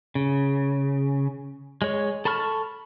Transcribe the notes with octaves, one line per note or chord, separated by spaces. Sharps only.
C#3
G#3 C#5
A4 A5 B5 C#6 F6